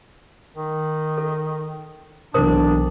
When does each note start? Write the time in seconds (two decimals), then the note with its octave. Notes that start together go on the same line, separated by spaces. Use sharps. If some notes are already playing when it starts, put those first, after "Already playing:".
0.56 D#3
1.18 A4
2.34 B1 G#2 C3 E3 D4 A#4 C5 D#6